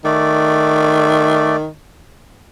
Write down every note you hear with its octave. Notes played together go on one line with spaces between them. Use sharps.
D#3 A3 D5